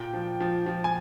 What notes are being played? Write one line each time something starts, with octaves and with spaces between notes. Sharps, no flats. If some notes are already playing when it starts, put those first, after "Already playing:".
Already playing: A#2 G5
F3
F3
F3
G#5